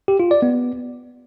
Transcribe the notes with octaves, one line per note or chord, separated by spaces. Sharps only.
G4
F4
D5
B3